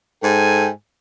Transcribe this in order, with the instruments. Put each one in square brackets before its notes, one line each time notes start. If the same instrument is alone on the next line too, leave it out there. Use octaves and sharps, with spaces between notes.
[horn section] G#2 A4 G5 G#5